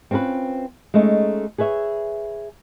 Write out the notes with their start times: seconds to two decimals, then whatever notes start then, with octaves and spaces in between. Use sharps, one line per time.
0.11 C4 C#4 F4 A#4 B4
0.94 G#3 A3 C#4 D#4
1.58 G#4 B4 C#5 E5